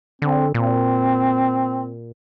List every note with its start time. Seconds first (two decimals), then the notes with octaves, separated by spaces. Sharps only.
0.22 D3 C4
0.54 A#2 C4